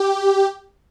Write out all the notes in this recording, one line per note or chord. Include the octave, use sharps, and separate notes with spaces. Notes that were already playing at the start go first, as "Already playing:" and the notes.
Already playing: G4